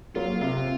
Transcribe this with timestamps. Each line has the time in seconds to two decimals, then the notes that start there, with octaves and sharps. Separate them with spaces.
0.15 F#3 A#3 F4
0.41 C3 F4